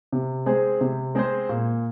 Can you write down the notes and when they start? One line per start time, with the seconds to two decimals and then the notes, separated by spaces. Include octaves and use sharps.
0.12 C3
0.46 G#3 C4 G#4 C5
0.81 C3
1.15 G#3 C4 G#4 C5
1.49 A#2